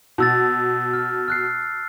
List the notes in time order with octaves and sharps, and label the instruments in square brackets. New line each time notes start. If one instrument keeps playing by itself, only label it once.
[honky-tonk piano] B2 [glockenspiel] A5 E6 A6
[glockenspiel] F6
F6 F#6 C7